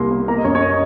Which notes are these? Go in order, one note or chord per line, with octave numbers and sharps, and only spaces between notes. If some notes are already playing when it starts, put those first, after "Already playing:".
Already playing: C2 A#3 C6
A#3
A#3 A#5
D#5
F#2 C#5
C#5
D#5